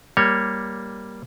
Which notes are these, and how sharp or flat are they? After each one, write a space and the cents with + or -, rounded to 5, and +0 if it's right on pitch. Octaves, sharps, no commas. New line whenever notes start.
G3 +0 A#3 +5 C#5 +0